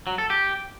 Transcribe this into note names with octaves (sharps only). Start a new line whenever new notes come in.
F#3
A4
G4